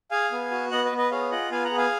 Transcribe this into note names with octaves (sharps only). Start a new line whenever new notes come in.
G#4 F5 G#5
B3
F#4
B3 D#5 F#5
B4 D#5
B3
B4 D#5
G#4 C#5 F5
F4 D#5 F#5
B3 F5 G#5
F#5 A#5
G#4
F5 G#5